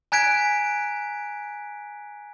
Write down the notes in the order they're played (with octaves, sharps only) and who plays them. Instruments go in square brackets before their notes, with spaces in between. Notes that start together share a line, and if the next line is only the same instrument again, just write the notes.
[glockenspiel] G#5 A#5 F#6 G#6 B6 D7